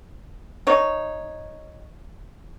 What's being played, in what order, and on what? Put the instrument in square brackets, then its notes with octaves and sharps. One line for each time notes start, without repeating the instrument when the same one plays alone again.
[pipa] D#4 C#5